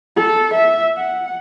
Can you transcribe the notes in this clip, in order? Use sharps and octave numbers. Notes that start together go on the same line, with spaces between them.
A4
E5
F#5